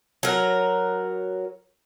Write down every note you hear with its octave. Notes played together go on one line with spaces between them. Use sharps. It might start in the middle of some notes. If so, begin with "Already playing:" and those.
F#3 A#4